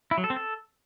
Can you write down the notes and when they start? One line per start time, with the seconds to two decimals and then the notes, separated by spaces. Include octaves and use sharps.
0.11 E4
0.18 F#3
0.24 A4
0.30 C4
0.36 A4